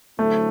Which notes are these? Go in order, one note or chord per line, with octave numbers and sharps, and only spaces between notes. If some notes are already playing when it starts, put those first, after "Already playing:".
D3 F#3 A3 C4 E4 A4